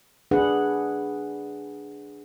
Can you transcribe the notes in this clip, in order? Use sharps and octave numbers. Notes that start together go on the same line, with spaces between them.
D4 G#4 B4 F#5